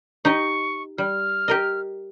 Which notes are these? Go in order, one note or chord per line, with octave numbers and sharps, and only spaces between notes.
D#4 G4 D#5 C#6
G3 F6
G4 A#4 D#5